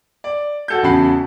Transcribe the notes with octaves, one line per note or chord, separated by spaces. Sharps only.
D5
F#4 A4 G6
E2 C#3 F#4 A5 B5 C7